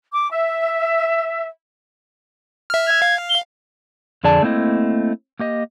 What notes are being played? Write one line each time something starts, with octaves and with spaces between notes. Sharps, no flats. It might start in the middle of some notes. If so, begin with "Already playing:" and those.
D6
E5
E5 F6
G#6
F5
G7
F2 D3 G#4 D5 A5
A3 A#3 C4 E4 D#5
A#3 G4 D#5